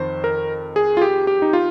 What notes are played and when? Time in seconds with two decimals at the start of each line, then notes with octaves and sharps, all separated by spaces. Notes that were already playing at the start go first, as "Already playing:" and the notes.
Already playing: F2 D#3 C5
0.24 A#4
0.76 G#4
0.97 F4
1.02 G4
1.27 G4
1.42 D#4
1.53 F4